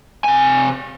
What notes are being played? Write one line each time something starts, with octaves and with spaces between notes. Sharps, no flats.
C3 G#5